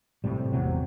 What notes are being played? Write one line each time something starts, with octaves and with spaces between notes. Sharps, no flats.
A2 C3 G3
G#1 E2 C3 F#3